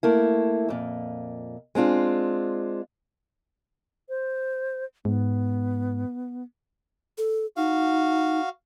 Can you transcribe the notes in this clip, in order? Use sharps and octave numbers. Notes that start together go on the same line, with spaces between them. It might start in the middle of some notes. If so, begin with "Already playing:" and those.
A3 A#3 E4
F2 A#2
G#3 C4 D4 F4
C5
G#2 B3
A4
D#4 F#4 F5